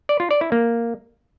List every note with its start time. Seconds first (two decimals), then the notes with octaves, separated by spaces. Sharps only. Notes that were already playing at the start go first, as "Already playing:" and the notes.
0.09 D5
0.20 F4
0.31 D5
0.41 E4
0.52 A#3